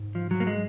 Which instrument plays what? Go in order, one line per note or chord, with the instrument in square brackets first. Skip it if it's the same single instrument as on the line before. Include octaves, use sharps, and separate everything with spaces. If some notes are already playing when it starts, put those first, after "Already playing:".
Already playing: [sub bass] G#2
[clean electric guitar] F3
F#3
A#3
G#3